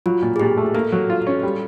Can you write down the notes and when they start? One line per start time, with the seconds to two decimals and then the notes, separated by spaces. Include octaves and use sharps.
0.06 F#3 F4
0.22 A#2
0.36 G#4
0.40 A#2 G4
0.57 A3
0.74 A#3 A4
0.92 F#3
1.10 F4
1.27 C#4
1.43 G3